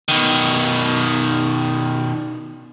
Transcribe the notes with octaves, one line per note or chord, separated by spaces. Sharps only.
B2 D#3